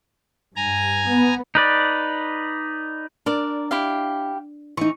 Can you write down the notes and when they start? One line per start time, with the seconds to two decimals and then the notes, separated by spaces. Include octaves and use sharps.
0.56 G2 G#5 A#5
1.08 B3
1.55 D#4 B4 D5
3.26 D4 A#4 D5
3.71 E4 G4 F5
4.77 E3 D#4 C#6